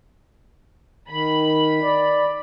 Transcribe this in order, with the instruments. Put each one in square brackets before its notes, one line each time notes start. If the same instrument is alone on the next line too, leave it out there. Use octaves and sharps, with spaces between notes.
[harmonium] D#3 [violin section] B5
[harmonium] D5